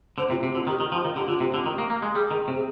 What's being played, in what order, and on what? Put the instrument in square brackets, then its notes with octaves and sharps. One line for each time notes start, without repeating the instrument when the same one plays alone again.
[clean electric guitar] D3 [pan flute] C5
[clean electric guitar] C3 [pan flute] F4
[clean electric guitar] C3 [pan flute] G4
[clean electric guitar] D3 [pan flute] F4
[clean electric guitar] D#3 [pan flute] G4
[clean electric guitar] D#3
[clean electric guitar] F3 [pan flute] F4
[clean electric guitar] D#3
[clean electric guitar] D3 [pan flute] G4
[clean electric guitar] D3 [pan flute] F4
[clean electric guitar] C3 [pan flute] G4
[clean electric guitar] D3
D#3
A#3
A#3
G#3
[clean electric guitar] G3 [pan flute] G#4
[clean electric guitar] D#3
C3
[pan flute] G#4